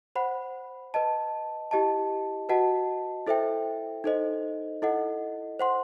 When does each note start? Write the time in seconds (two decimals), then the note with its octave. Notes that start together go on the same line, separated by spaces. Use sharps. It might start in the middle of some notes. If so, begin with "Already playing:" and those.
0.16 C5 F#5 B5
0.94 B4 D#5 A5
1.71 E4 G4 D#5 A5
2.49 F#4 B4 D#5 F#5 A5
3.27 E4 A4 C5 E5 G5
4.04 D#4 A4 C5 D#5
4.82 E4 A4 D#5 F#5
5.59 C5 F#5 C6